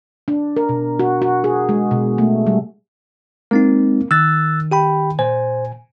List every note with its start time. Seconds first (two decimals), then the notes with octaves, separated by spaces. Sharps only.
0.28 D4
0.56 A#4
0.69 B2
0.99 F#4
1.22 F#4
1.44 G#4
1.69 G#3
1.91 B2
2.18 A3
2.47 G3
3.51 G#3 A#3 C4 D#4
4.11 D#3 E6 F#6 A6
4.71 G4 G5 B5
5.19 A#2 C5 G#5